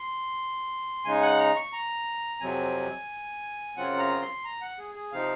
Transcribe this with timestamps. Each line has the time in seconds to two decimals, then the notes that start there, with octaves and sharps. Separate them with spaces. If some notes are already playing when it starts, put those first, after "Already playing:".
Already playing: C6
1.05 C#3 G#3 D#4 G#5
1.22 F#5
1.39 A#5
1.56 C#6
1.73 A#5
2.40 F2 C3 F#3 C4 G#5
3.77 F#2 C#3 F#3 C4 F4 F#5
3.99 A#5
4.22 C6
4.44 A#5
4.61 F#5
4.79 G#4
4.95 G#4
5.12 C3 F3 C4 D#4 F5